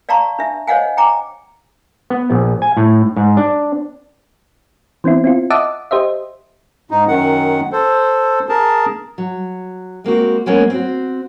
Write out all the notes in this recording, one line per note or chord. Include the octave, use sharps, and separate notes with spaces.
D5 F5 A5 A#5 C6 C#6
D4 E5
C5 C#5 D#5 F5 F#5 G#5
G5 G#5 A#5 D6
B3
A#1
G#5
A2
G#2
D4
E3 B3 C4 E4
C4 E4 F4
D#5 E5 F#5 A5 D6 D#6
G4 C5 D#5 E5
G#2 D#4
F#2 D#3 F#5
A4 C5
G#4 A#4 A5
F#3
G#3 A#3 C4 F#4
F#3 G#3 A#3 B3 C#4
C4 F#4